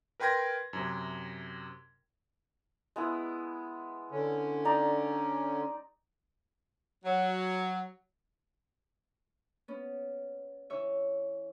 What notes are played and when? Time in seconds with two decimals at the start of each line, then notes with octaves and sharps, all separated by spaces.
0.20 A#4 B4 G5 C6 G#6 A#6
0.73 F#2 C3
2.96 G#3 B3 E4
4.11 D3 C#4
4.65 D#4 D5 A#5
7.04 F#3
9.68 B3 C#4
10.70 E3 C#5 E5